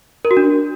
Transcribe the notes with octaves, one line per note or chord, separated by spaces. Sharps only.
A#4
F#4
D4